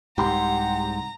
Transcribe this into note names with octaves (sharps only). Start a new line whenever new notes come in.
C2 G#2 G4 F#5 A#5 C6